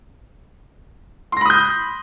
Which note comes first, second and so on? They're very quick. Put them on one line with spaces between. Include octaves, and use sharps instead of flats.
C6 A#6 B5 D#6 G6